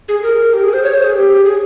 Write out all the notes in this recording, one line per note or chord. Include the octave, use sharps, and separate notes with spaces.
G#4
A#4
G4
G#4
C5
C#5
C5
G#4
G4
G#4